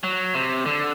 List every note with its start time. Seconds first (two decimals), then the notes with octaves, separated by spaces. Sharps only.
0.04 F#3
0.34 C3
0.66 D3